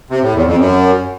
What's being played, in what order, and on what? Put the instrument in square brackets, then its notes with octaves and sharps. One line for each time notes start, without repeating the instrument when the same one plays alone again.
[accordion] C3
A2
E2
F2
F#2